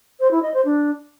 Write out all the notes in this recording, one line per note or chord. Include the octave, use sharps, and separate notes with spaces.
C5
E4
D#5
C5
D4